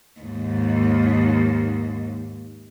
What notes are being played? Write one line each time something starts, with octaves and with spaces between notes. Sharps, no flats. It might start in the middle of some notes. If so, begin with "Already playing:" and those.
D#2 G#2